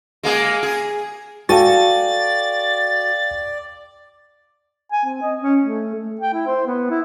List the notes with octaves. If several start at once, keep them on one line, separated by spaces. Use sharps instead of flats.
G#3 A#3 G#4
G#4
F#4 A4 D5 F5 G5 G#5 C#6 A6
G#5
C4
D#5
C#4
A3
A3
G5
E4
C5
B3
E4